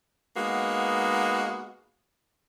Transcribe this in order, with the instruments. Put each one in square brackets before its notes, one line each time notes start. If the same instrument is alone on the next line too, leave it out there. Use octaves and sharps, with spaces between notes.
[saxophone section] G#3 A#3 B3 D#4 F#4